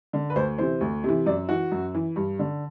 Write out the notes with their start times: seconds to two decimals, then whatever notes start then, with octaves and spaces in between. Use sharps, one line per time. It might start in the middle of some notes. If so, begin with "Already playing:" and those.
0.13 D3
0.30 B4
0.36 D2 C5
0.58 C3 E3 C5
0.81 D2
1.04 C3 E3
1.26 F#2 D5
1.49 E3 F#4
1.71 F#2
1.94 E3
2.16 G2
2.39 D3